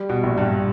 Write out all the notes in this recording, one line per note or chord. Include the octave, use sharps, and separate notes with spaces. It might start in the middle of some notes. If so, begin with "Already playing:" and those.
Already playing: G3
B2
A#1
G2